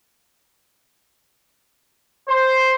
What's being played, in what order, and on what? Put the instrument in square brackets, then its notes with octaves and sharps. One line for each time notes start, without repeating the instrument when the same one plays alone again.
[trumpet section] C5